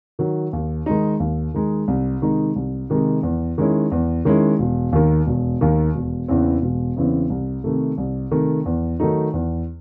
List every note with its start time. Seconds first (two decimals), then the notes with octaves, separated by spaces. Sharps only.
0.19 D#3 F#3
0.53 D#2
0.86 D#3 G#3 D#4
1.20 D#2
1.54 D#3 G#3 D#4
1.88 C2
2.22 C3 D#3 G#3 D#4
2.56 C2
2.90 C3 D#3 G#3 D#4
3.23 E2
3.58 D#3 G#3 C#4 E4
3.92 E2
4.25 D#3 G#3 C#4 E4
4.59 E1
4.93 D#2 D#3
5.27 E1
5.61 D#2 D#3
5.95 E1
6.28 E2 C#3 E3 C4
6.62 E1
6.96 E2 C#3 E3 C4
7.30 C2
7.64 C3 D#3 A3
7.98 C2
8.31 C3 D#3 A3
8.66 E2
9.00 D#3 F#3 A3 D#4
9.34 E2